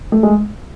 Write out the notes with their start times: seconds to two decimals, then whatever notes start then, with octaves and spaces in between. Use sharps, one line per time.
0.12 A3
0.23 G#3